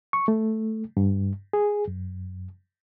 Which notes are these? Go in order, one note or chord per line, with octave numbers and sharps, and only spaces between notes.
C#6
A3
G2
G#4
F#2